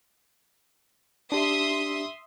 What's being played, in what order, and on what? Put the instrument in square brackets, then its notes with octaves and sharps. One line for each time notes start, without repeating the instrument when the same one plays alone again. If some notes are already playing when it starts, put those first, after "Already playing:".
[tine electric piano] D4 G4 [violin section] E5 C6 D#6